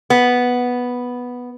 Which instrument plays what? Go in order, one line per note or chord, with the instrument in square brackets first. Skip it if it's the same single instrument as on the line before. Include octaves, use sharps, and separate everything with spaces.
[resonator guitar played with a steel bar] B3